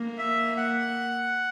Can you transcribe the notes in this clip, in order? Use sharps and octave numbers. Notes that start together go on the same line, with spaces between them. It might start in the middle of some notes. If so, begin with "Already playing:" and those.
Already playing: A#3
E5
F#5